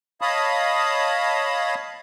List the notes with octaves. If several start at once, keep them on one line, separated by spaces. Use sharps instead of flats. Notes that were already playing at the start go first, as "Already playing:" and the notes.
C#5 D#5 F5 A5 B5 D#6